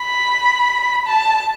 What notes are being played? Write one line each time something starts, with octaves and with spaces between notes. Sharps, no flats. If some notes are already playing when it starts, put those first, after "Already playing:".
Already playing: B5
A5